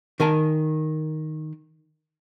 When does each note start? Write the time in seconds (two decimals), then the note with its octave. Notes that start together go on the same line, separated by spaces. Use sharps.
0.20 D#3 A#4 G#5 A5